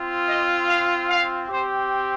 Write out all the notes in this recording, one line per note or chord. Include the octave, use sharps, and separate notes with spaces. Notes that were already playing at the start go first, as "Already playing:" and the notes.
Already playing: C4 F4
D#5
F5
F5
C4 G4 C5